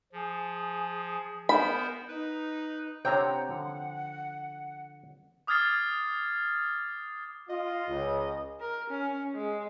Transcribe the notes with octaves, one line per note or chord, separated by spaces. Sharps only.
F3 G#4
B3 A#4 C5 B5
D#4 B4
C3 C4 D4 C5 C#5 F#5 G5 A#5
D3 F3
D6 D#6 F6 G#6 A6 C7
F4 D#5
C#2
A#4
C#4
G#3